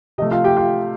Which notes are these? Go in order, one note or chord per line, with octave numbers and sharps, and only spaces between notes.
C3 F3 A3 D#5
F4 F5
G4 G5
F4 F5